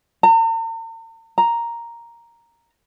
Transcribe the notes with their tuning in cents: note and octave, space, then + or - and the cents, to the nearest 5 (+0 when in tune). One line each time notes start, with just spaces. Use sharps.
A#5 -45
A#5 +0